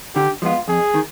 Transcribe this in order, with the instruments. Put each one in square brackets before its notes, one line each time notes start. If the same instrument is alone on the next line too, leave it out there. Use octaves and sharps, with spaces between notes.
[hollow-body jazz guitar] D3 [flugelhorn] G4
[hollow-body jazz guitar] F3 G#3 B3 F4
[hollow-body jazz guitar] F2 [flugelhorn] G#4
[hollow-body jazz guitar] D#3